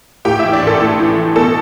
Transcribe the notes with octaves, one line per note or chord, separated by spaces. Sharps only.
A2 G4 G5
E3 E4 E5
D4 D5
A1 A4 A5
A2
E3
E3
B2 A4 A5